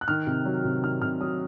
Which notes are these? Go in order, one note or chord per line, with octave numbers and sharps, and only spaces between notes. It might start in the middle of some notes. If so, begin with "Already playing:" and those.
F#6
D#3 F6
C3
F#3
C3
D#3 F6
C3 F6
F#3 D#6